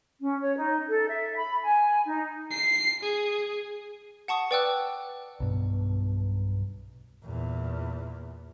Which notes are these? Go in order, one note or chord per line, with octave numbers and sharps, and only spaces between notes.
C#4
C#5
D#4
A4
E5
B5
G#5
D#4
C7
G#4
F#5 A5 C#6 D#6
B4 D5 G5 D6 E6 F#6
B1 G2 B2
E2 A#2